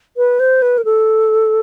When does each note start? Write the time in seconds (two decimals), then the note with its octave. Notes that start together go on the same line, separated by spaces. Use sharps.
0.17 B4
0.40 C5
0.62 B4
0.78 A#4
0.85 A4